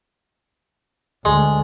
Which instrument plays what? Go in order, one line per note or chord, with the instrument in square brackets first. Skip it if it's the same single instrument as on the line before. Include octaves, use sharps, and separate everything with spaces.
[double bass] D2 [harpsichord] G#3